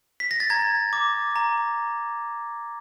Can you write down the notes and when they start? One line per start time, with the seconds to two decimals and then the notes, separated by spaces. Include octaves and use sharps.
0.20 B6
0.31 A#6
0.40 A6
0.50 A#5 G#6
0.93 D6
1.36 A#5